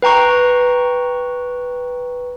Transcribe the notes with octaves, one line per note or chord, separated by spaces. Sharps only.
B4 G5 A#5 C#6